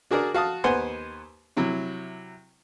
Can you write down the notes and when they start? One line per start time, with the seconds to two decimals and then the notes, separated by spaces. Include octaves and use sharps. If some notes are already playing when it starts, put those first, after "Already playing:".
0.11 D4 F#4 G#4 A#4 D5
0.34 F#4 F5 A5 D#6
0.64 D#2 B3 C5 F#5 G#5 C6
1.57 C3 F#3 E4